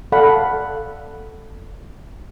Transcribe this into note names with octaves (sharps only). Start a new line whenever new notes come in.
A4 D5 F5 F#5 B5